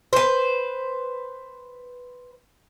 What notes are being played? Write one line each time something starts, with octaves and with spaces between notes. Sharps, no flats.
B4 C5